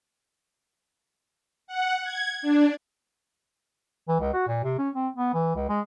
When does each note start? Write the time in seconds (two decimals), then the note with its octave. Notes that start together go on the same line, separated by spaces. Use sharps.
1.67 F#5
2.03 G#6
2.42 D4
4.08 E3
4.20 C#2
4.33 F#4
4.48 A#2
4.64 C3
4.78 C#4
4.95 C4
5.17 B3
5.34 E3
5.55 C#2
5.69 G#3